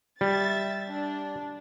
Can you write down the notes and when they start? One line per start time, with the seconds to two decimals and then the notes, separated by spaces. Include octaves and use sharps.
0.21 G3 E5 A6
0.90 D4